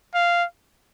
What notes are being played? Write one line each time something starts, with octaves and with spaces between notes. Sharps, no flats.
F5